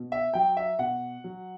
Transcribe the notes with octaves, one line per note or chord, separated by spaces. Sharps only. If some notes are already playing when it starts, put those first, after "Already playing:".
Already playing: B2
E5
F#3 G5
E5
B2 F#5
F#3